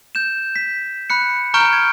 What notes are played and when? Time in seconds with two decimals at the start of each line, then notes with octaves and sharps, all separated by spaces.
0.15 G6 E7
0.56 B6
1.10 B5 F#6 C#7
1.54 A#5 C#6 F6 G6 D7 G7
1.73 G#6